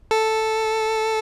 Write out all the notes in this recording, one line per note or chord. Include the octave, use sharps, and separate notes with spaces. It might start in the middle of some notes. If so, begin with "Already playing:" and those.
A4